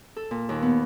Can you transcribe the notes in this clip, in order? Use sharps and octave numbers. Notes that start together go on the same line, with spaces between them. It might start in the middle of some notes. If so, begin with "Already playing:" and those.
A4
A#2
D#2
B3